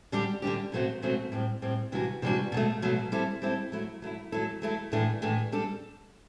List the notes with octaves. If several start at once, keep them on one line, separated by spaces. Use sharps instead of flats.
D3 G3 D4 G4
D3 G3 D4 G4
B2 F#3 A3 C4 F#4
B2 F#3 A3 C4 F#4
A2 G3 C4
A2 G3 C4
C3 E3 G3 D4 F#4
C3 E3 G3 D4 F#4
B2 F#3 A3
B2 F#3 A3
G3 C4 E4 A4
G3 C4 E4 A4
F#3 A3 E4
F#3 A3 E4
F#3 A3 E4 A4
F#3 A3 E4 A4
A2 E3 A3 D4
A2 E3 A3 D4
G3 D4 A4